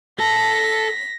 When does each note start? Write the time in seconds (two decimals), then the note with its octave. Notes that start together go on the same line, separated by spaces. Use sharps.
0.19 A4 A5 A#6 B6